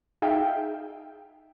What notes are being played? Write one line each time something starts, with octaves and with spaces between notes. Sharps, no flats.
D#4 G#4 E5 F5 G5